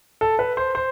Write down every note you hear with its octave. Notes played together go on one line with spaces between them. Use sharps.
A4
B4
C5
C5